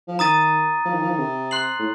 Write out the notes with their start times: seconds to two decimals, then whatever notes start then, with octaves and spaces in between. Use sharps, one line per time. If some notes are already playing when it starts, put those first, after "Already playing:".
0.08 F3
0.19 D#3 A#5 D#6 A6 D#7
0.85 F3
0.93 D#3
1.02 F3
1.10 D#3
1.19 C3
1.51 C6 F#6 C7 F#7
1.80 A2